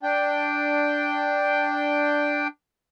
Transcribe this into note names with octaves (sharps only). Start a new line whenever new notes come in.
D4 G5